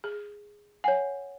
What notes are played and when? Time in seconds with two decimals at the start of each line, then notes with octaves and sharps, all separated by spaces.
0.04 G#4
0.84 C#5 F#5 G#5